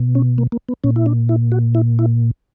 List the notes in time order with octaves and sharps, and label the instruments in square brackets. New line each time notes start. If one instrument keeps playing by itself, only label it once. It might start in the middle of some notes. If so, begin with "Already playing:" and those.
Already playing: [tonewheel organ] B2
C#4
A#3
A#3
B3
A#2 C#4
E4
D4
E4
F#4
E4
E4